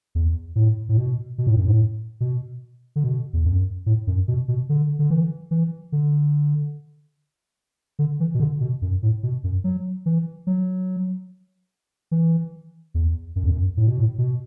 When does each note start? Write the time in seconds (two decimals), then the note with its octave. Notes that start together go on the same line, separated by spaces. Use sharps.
0.15 E2
0.56 A2
0.89 A2
0.97 B2
1.38 B2
1.47 A2
1.56 F#2
1.65 A2
2.20 B2
2.96 D3
3.04 B2
3.33 E2
3.45 F#2
3.86 A2
4.07 F#2
4.28 B2
4.48 B2
4.69 D3
4.99 D3
5.10 E3
5.51 E3
5.92 D3
7.99 D3
8.20 E3
8.34 B2
8.40 D3
8.61 B2
8.82 F#2
9.03 A2
9.23 B2
9.44 F#2
9.64 F#3
10.06 E3
10.47 F#3
12.11 E3
12.94 E2
13.36 F#2
13.44 E2
13.51 F#2
13.77 A2
13.87 B2
13.99 A2
14.18 B2